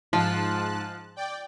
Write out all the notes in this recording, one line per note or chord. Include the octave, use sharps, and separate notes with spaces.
G#2 F3 F4 A5 F#6
D5 G5